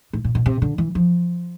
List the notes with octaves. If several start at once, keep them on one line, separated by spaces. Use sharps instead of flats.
A2
A#2
B2
C3
D3
E3
F3